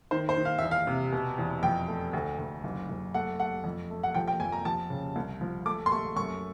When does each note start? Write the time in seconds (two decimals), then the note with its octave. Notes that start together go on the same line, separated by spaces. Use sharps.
0.11 D#3 C5
0.29 C5
0.37 D#3
0.45 F5
0.58 E2 E5
0.71 F5
0.87 C3
1.12 B2
1.38 E2
1.63 F2 G5
1.88 A3
2.13 D2
2.38 D2
2.64 F#1
2.89 F#1
3.14 A3 F#5
3.40 A3 F#5
3.64 F2
3.90 A3
4.03 F#5
4.15 F3 G5
4.28 G5
4.40 F2 G#5
4.52 A#5
4.65 F3 A5
4.90 C#3
5.16 C2
5.41 F3
5.66 A3 D6
5.86 C6
5.92 A3 C#6
6.16 F#2 C#6